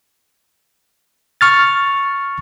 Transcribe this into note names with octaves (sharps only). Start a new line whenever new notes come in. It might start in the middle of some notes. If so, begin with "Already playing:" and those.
C#6 F6 A6